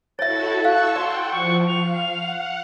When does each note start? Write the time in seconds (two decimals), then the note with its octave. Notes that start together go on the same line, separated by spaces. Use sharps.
0.19 E4 F#4 A4 C#5 E5 A6
0.65 F5 A5 C#6 E6 F#6
0.96 D5 F#5 G5 C6
1.31 F3 C#6
1.68 F5 F7
2.13 F#5